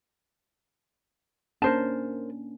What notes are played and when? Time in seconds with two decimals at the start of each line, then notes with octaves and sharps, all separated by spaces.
1.62 A#3 C#4 D4 A#4 C5 A5